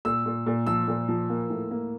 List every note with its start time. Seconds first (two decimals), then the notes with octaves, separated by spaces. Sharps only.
0.05 A#2 E6
0.26 A#2
0.46 A#2
0.67 F3 E6
0.88 A#2
1.09 F3
1.29 A#3
1.50 A2
1.71 A#3